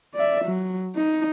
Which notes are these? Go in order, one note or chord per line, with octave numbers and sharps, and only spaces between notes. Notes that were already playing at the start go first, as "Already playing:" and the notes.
D5 E5
F#3
D#4